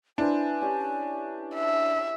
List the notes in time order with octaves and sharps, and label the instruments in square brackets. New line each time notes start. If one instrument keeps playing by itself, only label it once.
[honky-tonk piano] D4 [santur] E4 B4 C5 [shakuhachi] G#5
[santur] C#4 G4 D5
[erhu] E5